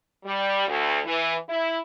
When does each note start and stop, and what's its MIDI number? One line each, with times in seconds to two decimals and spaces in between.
0.24 0.64 55
0.67 0.99 38
1.05 1.35 52
1.49 1.77 64